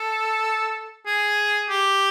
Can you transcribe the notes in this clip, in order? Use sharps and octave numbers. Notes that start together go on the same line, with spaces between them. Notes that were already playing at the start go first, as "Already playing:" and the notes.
Already playing: A4
G#4
G4